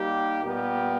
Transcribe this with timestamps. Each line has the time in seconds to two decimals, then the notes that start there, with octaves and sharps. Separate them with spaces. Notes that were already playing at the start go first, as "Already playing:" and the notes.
Already playing: G3 A#3 D#4 G4
0.44 A#2 G3 B3 G4 A#4